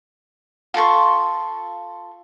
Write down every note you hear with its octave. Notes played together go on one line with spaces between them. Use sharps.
F4 A4 C6 C#6